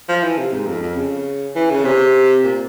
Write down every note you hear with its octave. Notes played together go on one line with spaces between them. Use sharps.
F3
E3
C3
G#2
F2
F2
C#3
E3
C#3
C3
A#2